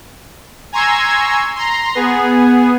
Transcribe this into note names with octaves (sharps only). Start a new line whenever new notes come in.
G#5 A#5 C6 C#6 E6 G#6
A#5 C6
B3 G#4